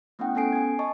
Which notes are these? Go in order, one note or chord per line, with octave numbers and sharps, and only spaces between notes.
A3 B3 C#4 E4 F#5 G5
B3 C#4 A4 G#5 C7 D7
G#5 G#6
D#5 A5 C#6